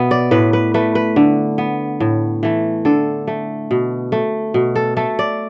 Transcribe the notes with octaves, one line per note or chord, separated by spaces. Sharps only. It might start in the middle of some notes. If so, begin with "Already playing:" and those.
Already playing: B2 B3 E5
D5
A2 B4
B4
A3 B4
B4
D3
B3
A2
E3 A3
D3 A4
A3
B2
A3
B2
A4
A3 A4
D5